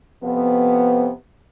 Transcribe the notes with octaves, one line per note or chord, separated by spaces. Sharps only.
F2 C3 F3 B3